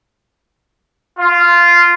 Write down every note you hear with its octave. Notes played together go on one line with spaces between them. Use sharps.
F4